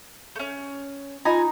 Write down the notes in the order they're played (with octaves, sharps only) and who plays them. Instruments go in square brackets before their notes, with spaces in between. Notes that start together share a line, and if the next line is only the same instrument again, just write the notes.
[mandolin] A3 C#4
[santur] D#4 [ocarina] F4 [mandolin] G#5 A#5 B5